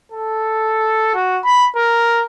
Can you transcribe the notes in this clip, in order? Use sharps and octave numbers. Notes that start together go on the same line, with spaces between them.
A4
F#4
B5
A#4